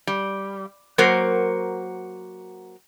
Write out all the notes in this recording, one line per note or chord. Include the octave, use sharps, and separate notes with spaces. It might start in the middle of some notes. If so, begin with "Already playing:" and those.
G3
F#3 A#3 F#4 A#4 C5